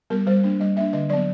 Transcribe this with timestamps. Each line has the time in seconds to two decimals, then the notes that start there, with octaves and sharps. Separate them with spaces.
0.10 G3 B3 A#4
0.27 G3 C5
0.44 A#3 D4
0.60 G3 D#5
0.77 A#3 D4 E5
0.93 D3 D#5
1.10 F#3 B3 D5